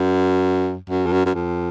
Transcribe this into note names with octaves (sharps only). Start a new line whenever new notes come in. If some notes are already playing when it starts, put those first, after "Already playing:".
Already playing: F#2
F#2
F2
F#2
F#2
F2